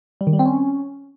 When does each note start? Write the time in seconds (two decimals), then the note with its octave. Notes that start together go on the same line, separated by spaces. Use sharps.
0.21 G3
0.27 D#3
0.33 G3
0.39 C4
0.45 C#4